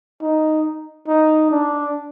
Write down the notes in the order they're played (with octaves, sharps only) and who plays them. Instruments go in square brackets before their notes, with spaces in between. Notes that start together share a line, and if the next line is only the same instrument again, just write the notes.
[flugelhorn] D#4
D#4
D4